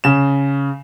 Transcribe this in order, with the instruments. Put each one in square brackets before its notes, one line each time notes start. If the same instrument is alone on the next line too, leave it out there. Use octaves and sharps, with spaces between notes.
[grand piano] C#3 E7